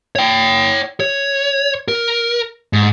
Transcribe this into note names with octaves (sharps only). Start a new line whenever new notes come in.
C#5 G5
C#5
A#4
G#2